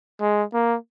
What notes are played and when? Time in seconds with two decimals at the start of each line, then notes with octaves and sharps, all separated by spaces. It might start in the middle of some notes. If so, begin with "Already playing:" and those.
0.20 G#3
0.53 A#3